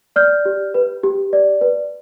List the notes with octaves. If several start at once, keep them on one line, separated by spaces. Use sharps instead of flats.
D5 F6 G6
G4
B4
G4
D5
B4